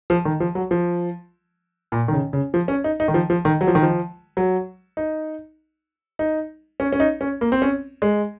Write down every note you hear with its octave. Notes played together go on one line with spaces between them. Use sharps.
F3
D#3
F3
F#3
F3
A#2
D#3
C#3
C#3
F3
C#4
D#4
D#4
D#3
F3
F3
D#3
F#3
F3
D#3
F3
F#3
D#4
D#4
C#4
C#4
D#4
C#4
A#3
C4
C#4
G#3